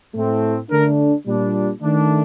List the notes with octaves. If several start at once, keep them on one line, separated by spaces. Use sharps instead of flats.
A2 A3 C4
D3 A3 D4 A#4
A#2 G3 D4
D#3 A3 D4